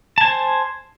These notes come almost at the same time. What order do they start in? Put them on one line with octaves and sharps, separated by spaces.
A5 G#5 C5